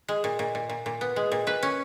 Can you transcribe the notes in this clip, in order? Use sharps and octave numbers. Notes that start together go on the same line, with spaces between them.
G#3
A#2
A#2
A#2
A#2
A#2
B3
G#3
A#2
A#2 B4
C#4